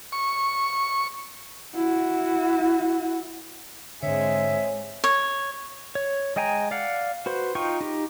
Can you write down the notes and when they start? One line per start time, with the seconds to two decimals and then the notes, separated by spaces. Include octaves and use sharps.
0.12 C#6
1.75 E4 F#4
4.03 G#2 D3 G#3 C4 G#4 C#5 E5
5.04 C#5
5.95 C#5
6.36 G#3 D#5 G5 G#5 A#5
6.71 D5 F5 F#5
7.26 F#4 B4 C5
7.55 D#4 F4 G5 C#6
7.81 D#4 G4